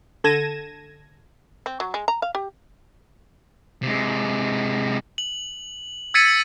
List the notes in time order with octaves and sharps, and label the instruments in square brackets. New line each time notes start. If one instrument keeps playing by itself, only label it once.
[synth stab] D3 A4 G#6 A#6 D#7 E7
[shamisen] C4
F#3
G#3
A#5
F5
G4
[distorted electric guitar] C3 G#3
[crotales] F#7
E6 G#6 A6 B6 C#7 D#7